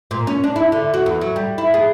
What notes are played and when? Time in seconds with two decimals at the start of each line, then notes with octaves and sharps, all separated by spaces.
0.11 A#2
0.27 C#4
0.44 D4
0.56 E4
0.72 D3
0.94 F#4
1.06 E2
1.21 F#3
1.36 G3
1.58 E4
1.74 G#4